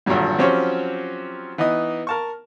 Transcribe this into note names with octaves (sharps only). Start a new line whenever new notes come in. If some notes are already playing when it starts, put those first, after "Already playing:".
G#1 G2 A#2 D3 F#3 G3
F3 F#3 C4 C#4 G4 C#5
E3 B3 D#4 D#5
A#4 A5 C#6